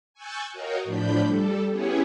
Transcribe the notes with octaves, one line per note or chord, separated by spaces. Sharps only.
G#5 C#6 E6 F#6 G6 A6
F#4 A#4 C#5 D#5 F5 G5
A2 F3 D4 B5 G6
G3 A4
B3 C#4 E4 G4 G#4 C#5